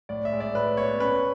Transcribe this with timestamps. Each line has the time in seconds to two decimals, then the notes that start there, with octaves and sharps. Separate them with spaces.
0.09 A2 D5
0.25 E5
0.32 G#3
0.40 D5
0.54 A2 B4
0.77 B3 C#5
1.00 C#4 B4